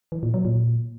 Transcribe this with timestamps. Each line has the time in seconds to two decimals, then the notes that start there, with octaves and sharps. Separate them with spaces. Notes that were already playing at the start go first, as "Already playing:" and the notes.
0.12 E3
0.23 A#2
0.34 F#3
0.45 A#2